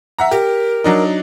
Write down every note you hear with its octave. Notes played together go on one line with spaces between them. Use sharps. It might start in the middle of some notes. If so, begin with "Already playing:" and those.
E5 F#5 A#5
G4 A#4
F#3 D4 D#4